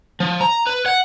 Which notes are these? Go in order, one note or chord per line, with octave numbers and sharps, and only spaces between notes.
F3
A#5
B4
F#5